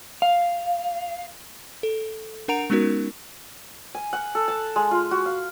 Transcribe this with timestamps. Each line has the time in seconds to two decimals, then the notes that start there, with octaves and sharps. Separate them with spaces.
0.22 F5
1.83 A4
2.48 D4 A#4 F#5 A#5 D7 F7
2.70 G#3 B3 C#4 D#4 F#4 A#4
3.95 G#5
4.13 F#5
4.35 A4
4.48 A5
4.76 G#3
4.91 F4
5.11 F#4
5.26 F5